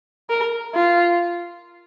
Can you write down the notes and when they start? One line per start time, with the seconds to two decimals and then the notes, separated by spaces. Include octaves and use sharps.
0.29 A#4
0.75 F4